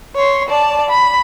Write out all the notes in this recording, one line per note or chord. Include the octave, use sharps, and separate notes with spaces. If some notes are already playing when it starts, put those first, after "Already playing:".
C#5 C6
D5 A5
B5